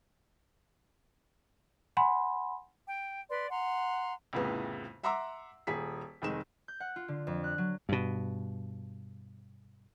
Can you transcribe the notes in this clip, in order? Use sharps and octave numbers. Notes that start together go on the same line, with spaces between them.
F#5 G#5 B5 C6
G5
B4 D5 C6
F#5 A#5 C6
C2 F2 A2 C#3 B3
E5 F#5 A#5 C6 D6 E6
D#1 G#4 B6
F1 D#3 G#3 E7
G6
F#5
F4
D3
F2
F#6
F#3
G2 B2